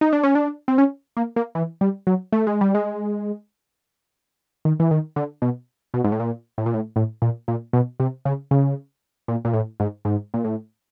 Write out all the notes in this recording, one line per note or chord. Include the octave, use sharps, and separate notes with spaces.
D#4
D4
C#4
D4
C4
C#4
A#3
A#3
E3
G3
F#3
A3
G#3
G3
G#3
D#3
E3
D#3
D3
B2
B2
G#2
A2
A#2
A2
A#2
A2
A2
A#2
A#2
B2
C3
C#3
C#3
A#2
A#2
A2
G#2
G#2
A#2
A2